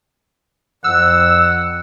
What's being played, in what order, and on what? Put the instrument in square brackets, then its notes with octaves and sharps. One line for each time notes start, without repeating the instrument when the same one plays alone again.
[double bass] F2 [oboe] F#5 [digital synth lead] E6